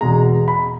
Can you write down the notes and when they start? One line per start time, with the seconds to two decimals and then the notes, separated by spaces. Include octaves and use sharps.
0.01 E2 B2 G#3 A#5
0.48 B5